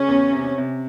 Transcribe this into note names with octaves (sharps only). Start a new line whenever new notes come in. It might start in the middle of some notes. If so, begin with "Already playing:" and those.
Already playing: C#3 C#4
E2
C3
C3